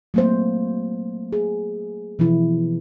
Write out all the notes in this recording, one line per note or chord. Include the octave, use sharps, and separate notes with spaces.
F#3 A3 A#3 C4 C5
G#4
B2 E3 F3 E4